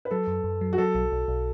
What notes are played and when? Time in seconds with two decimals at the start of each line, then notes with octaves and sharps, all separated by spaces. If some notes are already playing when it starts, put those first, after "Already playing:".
0.05 B4
0.11 F#3 A4
0.27 F#2
0.44 F#2
0.61 F#3
0.73 F#4
0.78 F#3 A4
0.95 B1
1.12 B1
1.28 B1